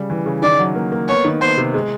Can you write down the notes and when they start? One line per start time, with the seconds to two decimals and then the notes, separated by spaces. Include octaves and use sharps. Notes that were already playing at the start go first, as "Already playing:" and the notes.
Already playing: C#3 G3
0.10 E3
0.26 C#3
0.42 D#3 D5
0.59 F#3
0.75 A#3
0.92 A#3
1.08 B3 C#5
1.25 D#3
1.41 B3 C5
1.58 C3
1.74 G#3